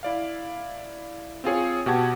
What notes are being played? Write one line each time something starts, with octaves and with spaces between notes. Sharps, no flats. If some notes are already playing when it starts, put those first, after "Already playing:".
E4 D5 F5
C4 F4 G#4 C#5
B2 F#4 G4 F#5 A5 G#6